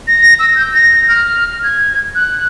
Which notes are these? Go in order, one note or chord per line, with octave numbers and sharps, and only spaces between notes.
A#6
E6
G6
A#6
F6
G#6
F#6